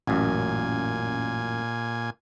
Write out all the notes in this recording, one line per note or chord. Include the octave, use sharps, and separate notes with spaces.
A1 F#2 A#2 G#5